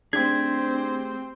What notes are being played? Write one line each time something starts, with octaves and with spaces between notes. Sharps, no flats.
A3 C4 D4 G4 G#4 C5 G#6